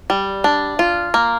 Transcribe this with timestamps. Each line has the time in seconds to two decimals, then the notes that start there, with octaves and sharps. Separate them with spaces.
0.10 G3
0.44 D4
0.79 F4
1.14 A#3